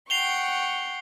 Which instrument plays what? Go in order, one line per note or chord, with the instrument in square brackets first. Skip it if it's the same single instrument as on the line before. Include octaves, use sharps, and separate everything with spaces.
[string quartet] F#5 G5 C#6 [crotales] C7 F7 G7